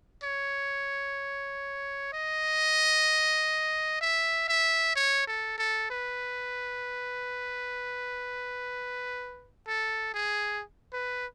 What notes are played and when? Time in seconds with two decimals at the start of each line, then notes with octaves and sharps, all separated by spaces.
0.24 C#5
2.13 D#5
4.01 E5
4.48 E5
4.96 C#5
5.27 A4
5.58 A4
5.90 B4
9.68 A4
10.14 G#4
10.93 B4